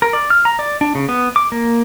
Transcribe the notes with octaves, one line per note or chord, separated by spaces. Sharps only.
A#4
D5
F6
A#5
D5
D4
C#3
B3
D6
A#3